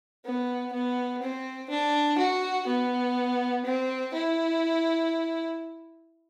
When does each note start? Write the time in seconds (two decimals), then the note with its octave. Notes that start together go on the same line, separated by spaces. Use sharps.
0.25 B3
0.73 B3
1.22 C4
1.70 D4
2.19 F#4
2.67 B3
3.65 C4
4.14 E4